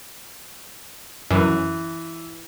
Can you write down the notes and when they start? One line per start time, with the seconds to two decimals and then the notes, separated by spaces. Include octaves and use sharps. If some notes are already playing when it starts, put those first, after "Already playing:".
1.31 F#2 E3